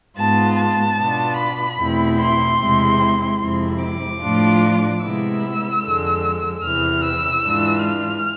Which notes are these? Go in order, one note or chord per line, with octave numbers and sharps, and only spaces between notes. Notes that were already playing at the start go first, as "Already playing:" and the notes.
G#2 G#3 B3 F4 A5
A5
B2 B3 D4 F4
B5
E2 B2 A3 C4 E4
C6
E2 C3 G#3 C4 E4
F2 C3 G#3 C4 E4
D6
A2 F3 A3 D4 F4
C3 G#3 B3 E4 E6
F2 D3 G#3
E2 C3 E3 F6
E6
G#2 E3 G#3 D4 F4
F6